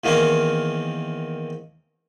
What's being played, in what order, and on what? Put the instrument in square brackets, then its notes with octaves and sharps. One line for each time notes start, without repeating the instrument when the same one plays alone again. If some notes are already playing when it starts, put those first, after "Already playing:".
[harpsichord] E2 D#3 A#3 C4 C#4 C6